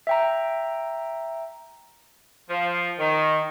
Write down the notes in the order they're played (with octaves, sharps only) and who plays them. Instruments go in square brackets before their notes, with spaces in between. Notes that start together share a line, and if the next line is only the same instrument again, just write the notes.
[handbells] E5 G5 A#5
[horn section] F3
D#3